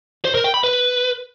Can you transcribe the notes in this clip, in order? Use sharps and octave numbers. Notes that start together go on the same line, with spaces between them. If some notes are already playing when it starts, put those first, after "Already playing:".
C5
A#4
G5
B5
B4